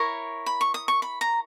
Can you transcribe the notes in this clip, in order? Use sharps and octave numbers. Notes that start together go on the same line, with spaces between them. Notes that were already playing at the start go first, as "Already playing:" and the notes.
Already playing: E4 A#4 C#5 C#6
B5
C#6
D#6
C#6
B5
A#5